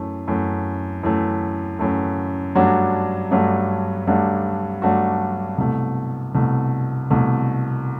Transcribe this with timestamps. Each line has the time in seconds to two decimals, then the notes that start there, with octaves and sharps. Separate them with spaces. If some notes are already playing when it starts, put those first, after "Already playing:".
Already playing: F#2 E3 A3
0.27 F#2 E3 A3
1.03 F#2 E3 A3
1.79 F#2 E3 A3
2.55 G2 F#3 A3 D4 F#4
3.31 G2 F#3 A3 D4 F#4
4.07 G2 F#3 A3 D4 F#4
4.82 G2 F#3 A3 D4 F#4
5.58 C2 B2 A3
6.35 C2 B2 A3
7.10 C2 B2 A3